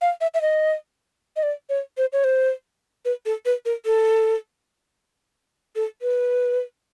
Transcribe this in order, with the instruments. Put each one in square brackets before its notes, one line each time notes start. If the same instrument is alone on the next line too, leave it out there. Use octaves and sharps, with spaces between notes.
[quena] F5
E5
E5
D#5
D#5
D5
C#5
C5
C#5
C5
B4
A4
B4
A#4
A4
A4
B4